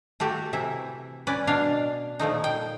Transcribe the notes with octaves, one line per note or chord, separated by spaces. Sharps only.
A3 F#4 G4 A4
C3 E3 E4 E5
C#4 B4 D5
B2 D4 F5
A#2 F3 A3 D#4
G5